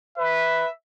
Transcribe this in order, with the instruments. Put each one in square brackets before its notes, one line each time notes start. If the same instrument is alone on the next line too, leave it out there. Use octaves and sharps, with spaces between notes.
[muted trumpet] B4 [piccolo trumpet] E5